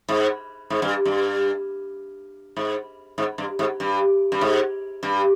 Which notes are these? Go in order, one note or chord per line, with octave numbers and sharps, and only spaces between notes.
G#2
G#2
G2
G2
G#2
G#2
G2
G#2
G2
G2
G#2
G2